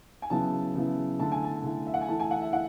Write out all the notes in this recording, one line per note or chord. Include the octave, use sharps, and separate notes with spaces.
G#5
C#3 F#3 B3 E4 A5
C#3 F#3 B3 E4
D3 A3 E4 A5
G#5
A5
D3 A3 E4
E5
F#5
G#5
E3 A3 E4 A5
G#5
F#5
E5
E3 F#5